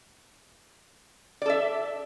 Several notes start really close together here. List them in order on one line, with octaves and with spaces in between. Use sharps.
D5 A4 E5